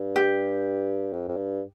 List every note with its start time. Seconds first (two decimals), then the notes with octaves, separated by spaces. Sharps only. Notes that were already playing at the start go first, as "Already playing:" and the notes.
Already playing: G2
0.16 G4
1.13 F2
1.28 F2
1.37 G2